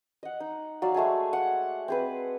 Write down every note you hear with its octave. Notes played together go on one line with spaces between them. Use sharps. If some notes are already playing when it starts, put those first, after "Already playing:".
D#5 F#5
D#4
F#3 D5 F5
G#3 A3 G#4 G#5
F#5
C4 G#4 B4